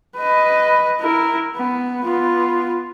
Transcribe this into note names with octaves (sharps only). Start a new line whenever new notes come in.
B4 D#5
E4 A#4
B3
B3 F4